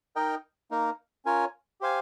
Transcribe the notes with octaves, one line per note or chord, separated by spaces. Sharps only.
D#4 A#4 D#5 G5
A#3 D#4 A#4
C#4 F4 A#4 C#5 G#5
G4 C5 F5 G#5